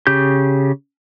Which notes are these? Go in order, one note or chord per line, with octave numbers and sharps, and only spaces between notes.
C#3 G4 G6